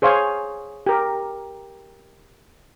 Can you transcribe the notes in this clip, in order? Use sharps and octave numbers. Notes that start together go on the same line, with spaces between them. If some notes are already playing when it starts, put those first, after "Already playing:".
G#4 C5 C#5 F5 G#5
G4 A#4